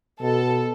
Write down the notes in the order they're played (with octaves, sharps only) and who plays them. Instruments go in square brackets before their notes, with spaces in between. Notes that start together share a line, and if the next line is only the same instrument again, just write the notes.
[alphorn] B2 [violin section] A4